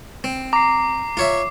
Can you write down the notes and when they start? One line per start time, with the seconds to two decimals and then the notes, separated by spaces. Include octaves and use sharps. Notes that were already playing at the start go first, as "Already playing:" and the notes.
0.24 C4
0.53 A#5 D6 C7
1.17 F4 C#5 E5